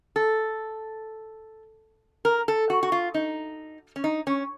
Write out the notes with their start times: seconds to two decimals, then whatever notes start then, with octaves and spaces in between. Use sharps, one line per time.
0.16 A4
2.25 A#4
2.48 A4
2.70 F#4
2.83 F#4
2.92 F4
3.14 D#4
3.96 C#4
4.04 D#4
4.27 C#4